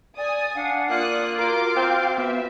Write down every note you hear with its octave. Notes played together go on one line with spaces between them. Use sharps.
D5 G#5 D#6
D4 F5 F#5
A#3 F4 D5 D#6 F#6
F#4 A#4 C6 D6
C4 F5 G5
B3 E5